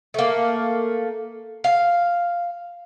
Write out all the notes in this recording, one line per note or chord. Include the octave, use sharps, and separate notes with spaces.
A3 A#3
F5